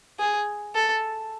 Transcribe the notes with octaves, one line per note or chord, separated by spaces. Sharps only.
G#4
A4